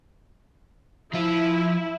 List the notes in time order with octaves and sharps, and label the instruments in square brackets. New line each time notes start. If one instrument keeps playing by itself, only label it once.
[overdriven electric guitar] F3 F4 [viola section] E4